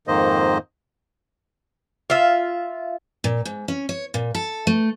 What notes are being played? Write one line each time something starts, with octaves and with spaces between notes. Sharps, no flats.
F2 G#2 D#3 A#3 C5 D#5
F4 E5
A#2
G#2
C#4
C#5
A#2
A4
A3